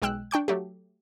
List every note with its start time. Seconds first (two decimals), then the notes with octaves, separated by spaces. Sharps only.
0.02 B1 G#3 G5 E6 F#6
0.31 D4 G5 C#6 G6
0.48 F#3 A3 G4